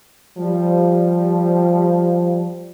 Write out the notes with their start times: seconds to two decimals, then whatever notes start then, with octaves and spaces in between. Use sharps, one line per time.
0.37 F3 G3